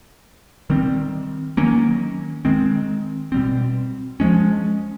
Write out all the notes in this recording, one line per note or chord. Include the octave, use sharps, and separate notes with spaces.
D#3 G3 C4
D#3 F#3 A#3 C#4
D#3 G#3 C4
B2 G3 C4
F3 G#3 C#4